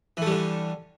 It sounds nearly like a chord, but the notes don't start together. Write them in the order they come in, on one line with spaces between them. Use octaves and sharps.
E3 A3 G3 D3